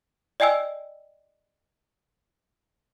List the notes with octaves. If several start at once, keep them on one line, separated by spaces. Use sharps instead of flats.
D5 D#5 G5 G#5 E6